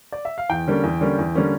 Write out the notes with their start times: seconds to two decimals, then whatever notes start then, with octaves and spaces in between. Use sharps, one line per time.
0.12 D5
0.25 E5
0.38 F5
0.49 E2 G5
0.67 D3 G3 A#3 C#4
0.84 E2
1.01 D3 G3 A#3 C#4
1.19 E2
1.35 D3 G3 A#3 C#4